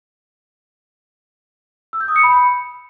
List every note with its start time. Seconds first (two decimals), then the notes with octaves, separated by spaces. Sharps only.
1.93 E6
2.01 G6
2.08 D#6
2.16 C#7
2.23 B5